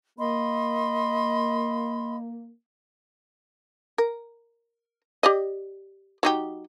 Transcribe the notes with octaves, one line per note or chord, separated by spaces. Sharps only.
A#3 D#5 B5 C6
A#4
G4 D5 D#5
F#3 D#4 G4